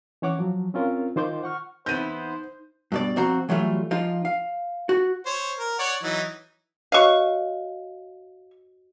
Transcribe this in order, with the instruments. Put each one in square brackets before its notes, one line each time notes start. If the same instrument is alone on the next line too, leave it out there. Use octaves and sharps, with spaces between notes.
[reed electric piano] E3 C#4 C#5 F#5 D6
F3 F#3
C4 C#4 F4 A#4
D#3 F4 C5 C6 D6 G6
F#5 C#6 F6
[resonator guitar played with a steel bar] E2 B3 E4 [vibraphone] D#4 [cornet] C5 [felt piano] G6 D#7
[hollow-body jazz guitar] G2 B2 D5
F2 C4 F#4 A#5
E3 F#3 G3 A3 F4
F3 D#4 F4
F5
F#4
[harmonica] C5 C#5
A#4
C#5 D5 F#5
E3 F#3 D#4
[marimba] F#4 C#5 D#5 [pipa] F5 C#6